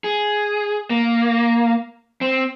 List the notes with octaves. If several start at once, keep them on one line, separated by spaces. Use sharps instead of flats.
G#4
A#3
C4